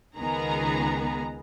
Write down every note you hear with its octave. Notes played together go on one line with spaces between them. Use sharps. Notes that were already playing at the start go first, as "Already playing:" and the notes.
C#2 D#3 B3 G#4 A#5